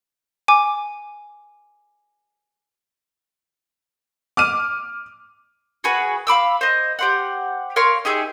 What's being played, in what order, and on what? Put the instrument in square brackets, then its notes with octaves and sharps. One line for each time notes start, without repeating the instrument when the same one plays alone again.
[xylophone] G#5 D6
[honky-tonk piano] D6 F6 D#7
[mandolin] F#4 G#4 B4
F5 B5 D6 E6
C5 D#5
G4 C5 F#5
A#4 C#5 F5 C6
D#4 G4 G#4 E5